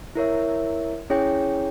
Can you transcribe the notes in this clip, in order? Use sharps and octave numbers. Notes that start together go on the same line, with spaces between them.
E4 A#4 C#5 E5
C#4 E4 G#4 C#5 G5